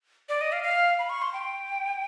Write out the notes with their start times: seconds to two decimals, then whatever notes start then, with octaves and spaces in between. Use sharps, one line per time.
0.29 D5
0.41 D#5
0.52 F5
0.63 F5
0.99 B5
1.09 C#6
1.22 C6
1.33 G5